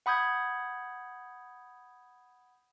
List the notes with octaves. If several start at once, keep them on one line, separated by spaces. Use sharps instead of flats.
F#5 B5 D#6 G6 G#6